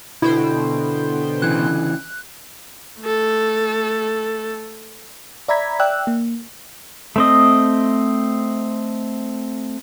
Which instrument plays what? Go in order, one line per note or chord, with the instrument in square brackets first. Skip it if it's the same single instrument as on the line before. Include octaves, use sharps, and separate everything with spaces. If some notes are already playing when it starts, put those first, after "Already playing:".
[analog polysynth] B2 C5 G5 [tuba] D3 [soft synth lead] E4
[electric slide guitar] C#3 E3 [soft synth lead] F#6
[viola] A3 A4
[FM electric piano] D5 E5 A#5 B5 G#6 B6
D5 E5 G5 E6 F#6
A#3
[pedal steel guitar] A3 C4 D#5